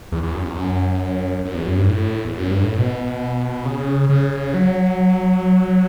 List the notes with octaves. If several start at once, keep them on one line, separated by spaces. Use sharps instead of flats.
E2
E2
F#2
E2
F#2
F#2
E2
F#2
G2
A2
E2
F#2
G2
A2
B2
C#3
C#3
F#3